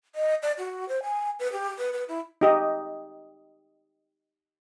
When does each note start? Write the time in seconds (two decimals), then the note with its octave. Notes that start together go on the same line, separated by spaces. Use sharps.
0.15 D#5
0.42 D5
0.58 F#4
0.89 C5
1.03 G#5
1.39 B4
1.52 G4
1.78 B4
1.93 B4
2.08 E4
2.41 D#4 G4 D#5